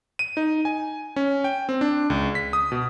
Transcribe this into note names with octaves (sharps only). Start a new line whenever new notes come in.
D#7
D#4
G#5
C#4
G5
C4
D4
C#2
B6
D#6
B2